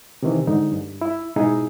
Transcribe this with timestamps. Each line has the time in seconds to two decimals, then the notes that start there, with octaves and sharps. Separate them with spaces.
0.23 C3 D#3 E3
0.47 G#2 D3 D#4
0.72 G2
1.01 E4
1.36 G#2 B2 D#4 E4 G#4